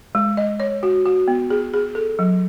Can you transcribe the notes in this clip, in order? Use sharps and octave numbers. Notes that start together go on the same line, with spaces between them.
G#3
D#5
C#5
F#4
F#4
B3
G#4
G#4
A4
F#3